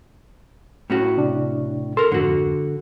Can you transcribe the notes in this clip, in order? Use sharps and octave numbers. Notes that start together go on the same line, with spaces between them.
A2 C#4 F#4
C3 D4
A4 A#4 C6
F2 G#2 D3 F#4